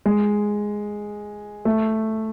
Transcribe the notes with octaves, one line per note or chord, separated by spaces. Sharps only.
G#3
A3